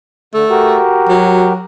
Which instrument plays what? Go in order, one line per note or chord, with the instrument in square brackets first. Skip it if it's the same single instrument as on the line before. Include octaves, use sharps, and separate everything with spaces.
[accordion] D3 [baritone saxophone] A3
[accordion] F#4 G4 A#4
[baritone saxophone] F#3